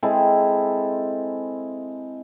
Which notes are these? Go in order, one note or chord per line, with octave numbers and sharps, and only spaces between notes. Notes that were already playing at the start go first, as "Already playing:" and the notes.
G#3 C4 E4 A4